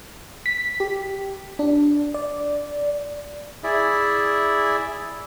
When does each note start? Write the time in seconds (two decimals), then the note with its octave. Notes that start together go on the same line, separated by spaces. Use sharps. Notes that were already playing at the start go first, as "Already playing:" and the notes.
0.46 B6
0.80 G4
1.59 D4
2.14 D5
3.64 E4 G#4 D5 E5